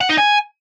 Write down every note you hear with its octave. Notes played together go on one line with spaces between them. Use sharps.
F#5
D#4
G#5